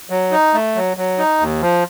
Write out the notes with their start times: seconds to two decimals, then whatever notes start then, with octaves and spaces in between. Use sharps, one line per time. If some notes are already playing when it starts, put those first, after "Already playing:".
0.10 F#3
0.31 D#4
0.54 A3
0.75 F#3
0.97 F#3
1.18 D#4
1.40 D#2
1.62 F3